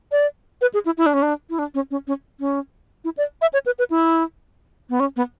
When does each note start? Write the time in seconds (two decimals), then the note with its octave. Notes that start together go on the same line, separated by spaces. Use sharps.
0.12 D5
0.61 B4
0.74 G#4
0.85 E4
0.97 E4
1.06 D4
1.14 C#4
1.22 D4
1.50 E4
1.59 D4
1.74 C#4
1.91 C#4
2.07 C#4
2.40 C#4
3.04 E4
3.17 D5
3.42 E5
3.53 C#5
3.66 B4
3.79 B4
3.90 E4
4.90 B3
5.00 C#4
5.16 B3